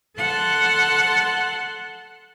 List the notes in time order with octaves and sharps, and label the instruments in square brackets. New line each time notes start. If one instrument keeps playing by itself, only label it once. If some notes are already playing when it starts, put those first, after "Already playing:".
[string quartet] A4 F#5 A5 C6 F#6